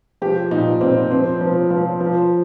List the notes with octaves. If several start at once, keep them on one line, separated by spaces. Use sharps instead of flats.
F3 G4
A#2 D#4
A#2 C4
F3 C4
F3
F3
F3